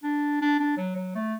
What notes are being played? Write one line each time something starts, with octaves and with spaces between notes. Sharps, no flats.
D4
D4
D4
F#3
F#3
A3